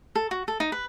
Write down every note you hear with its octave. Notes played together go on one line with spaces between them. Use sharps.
A4
F#4
A4
D#4
B4